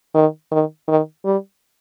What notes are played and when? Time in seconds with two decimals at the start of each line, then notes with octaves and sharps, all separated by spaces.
0.15 D#3
0.52 D#3
0.88 D#3
1.25 G3